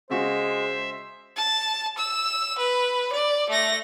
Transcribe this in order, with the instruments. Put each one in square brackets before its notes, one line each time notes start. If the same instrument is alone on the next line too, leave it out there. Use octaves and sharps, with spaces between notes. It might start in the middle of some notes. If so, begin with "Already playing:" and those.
[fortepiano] C#3 F#4 [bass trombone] G#3 [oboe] C5 [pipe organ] E5
[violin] A5
E6
B4
D5
A3 A#6